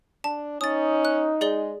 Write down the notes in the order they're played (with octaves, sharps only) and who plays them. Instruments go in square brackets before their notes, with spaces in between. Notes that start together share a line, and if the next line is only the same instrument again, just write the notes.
[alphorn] D4 [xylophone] A5
[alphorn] C#4 [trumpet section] D#4 [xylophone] D#6 A6
[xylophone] F#6
[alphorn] G#3 [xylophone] G#4 D5 G7